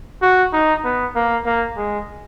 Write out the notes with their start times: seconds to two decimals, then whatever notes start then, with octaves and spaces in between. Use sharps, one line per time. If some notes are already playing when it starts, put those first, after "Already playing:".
0.22 F#4
0.53 D#4
0.84 B3
1.15 A#3
1.46 A#3
1.77 G#3